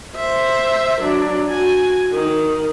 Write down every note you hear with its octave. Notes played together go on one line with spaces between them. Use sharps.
C5 E5
F#3 D4
F#4 G#5
D#3